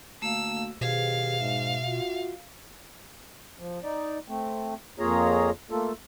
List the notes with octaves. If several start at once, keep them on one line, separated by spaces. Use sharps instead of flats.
D3 A3 A#3 F#4 F5 E6
B2 D#3 G4 G#4 B4 C5 F5
G#2 E5
F4 F#4
F3
D#4 D5
A3 C4
F2 A#3 F4 G#4 C#5 A#5
A3 A#3 F4 A4